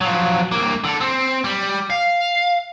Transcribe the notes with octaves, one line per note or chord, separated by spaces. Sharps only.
F3 F#3
C2 A#3
D3 A4
C4
G3
F5